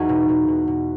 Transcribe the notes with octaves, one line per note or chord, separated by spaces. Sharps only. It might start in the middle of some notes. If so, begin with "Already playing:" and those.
Already playing: E2 D#4 F#4 G#4
B2
B2
B2
B2